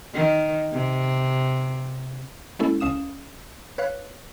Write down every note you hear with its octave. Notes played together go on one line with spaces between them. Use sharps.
D#3
C3
G#3 A#3 C#4 E4 A4
C#2 C#4 F5 D#6 E7
B4 C#5 F5 F#6